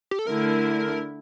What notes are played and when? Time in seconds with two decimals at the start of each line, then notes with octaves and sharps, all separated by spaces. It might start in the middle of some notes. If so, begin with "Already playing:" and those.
0.11 G4
0.19 A4
0.26 D3 A3 E4 A#4